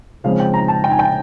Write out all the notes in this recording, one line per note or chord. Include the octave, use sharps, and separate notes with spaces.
C#3 F3 G#3 C4 F5
G5
A#5
A5
G5
G#5
G5